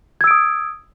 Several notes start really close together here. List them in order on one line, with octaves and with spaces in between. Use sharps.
G#6 E6 D7 D#6